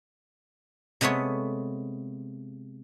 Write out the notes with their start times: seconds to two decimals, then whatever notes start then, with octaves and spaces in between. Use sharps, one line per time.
1.01 C3 G#3 A3 B3 C#5